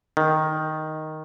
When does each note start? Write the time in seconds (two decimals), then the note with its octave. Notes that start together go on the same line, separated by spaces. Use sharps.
0.17 D#3